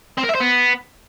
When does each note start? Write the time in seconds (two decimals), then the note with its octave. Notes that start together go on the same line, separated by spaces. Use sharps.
0.18 C4
0.23 A#4
0.29 E5
0.35 C5
0.40 B3